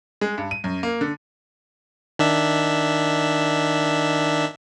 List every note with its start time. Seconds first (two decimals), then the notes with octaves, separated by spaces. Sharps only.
0.21 G#3
0.38 G2
0.51 D#7
0.64 F#2
0.83 A#3
1.01 D3
2.19 D#3 D4 E5